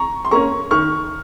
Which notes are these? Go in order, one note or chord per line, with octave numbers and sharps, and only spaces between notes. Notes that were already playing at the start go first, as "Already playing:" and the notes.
Already playing: A#5 C#6
C6
A#3 C#4 A#5 C#6
D#3 C#6 F6